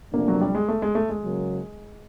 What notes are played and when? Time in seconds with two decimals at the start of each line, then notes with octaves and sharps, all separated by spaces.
0.13 C3 F3 A3 A#3 D4
0.28 F#3
0.41 G3
0.55 G#3
0.68 A3
0.82 G#3
0.95 A3
1.09 G#3
1.23 C#3 F#3 A#3